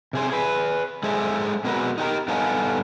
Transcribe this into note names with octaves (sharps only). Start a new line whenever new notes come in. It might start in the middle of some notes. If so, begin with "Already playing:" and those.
C3 G#4 C5
G#4 B4
G#3 G#4 A4 C5 E5
B2 G#3 C4 F#4 A#4 B4
D#4 G4 A#4
G2 B3 D#4 A4 F5 G#5